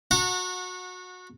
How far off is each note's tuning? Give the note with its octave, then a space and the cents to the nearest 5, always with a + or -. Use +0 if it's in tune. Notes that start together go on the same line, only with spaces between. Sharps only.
F#4 -20 F#5 -30 A#5 -40